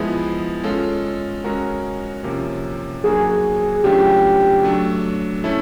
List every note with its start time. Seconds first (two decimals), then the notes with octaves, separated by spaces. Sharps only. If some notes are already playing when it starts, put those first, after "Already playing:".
Already playing: F3 G#3 B3 E4 G#4
0.64 G#3 C#4 F4 A4
1.44 G#3 C#4 F#4 A#4
2.23 C3 F3 A#3 C#4
3.04 D3 F#3 A#3 D4 F#4 G#4
3.83 C#3 F#3 A3 D4 F4 G4
4.63 F#3 A3 D4
5.44 A3 C#4 E4 A4